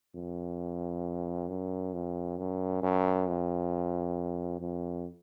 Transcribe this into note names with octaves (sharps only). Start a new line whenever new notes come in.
F2
F#2
F2
F#2
F#2
F2
F2